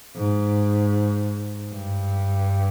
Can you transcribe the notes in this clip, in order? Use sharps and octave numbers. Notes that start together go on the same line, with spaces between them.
G#2
G2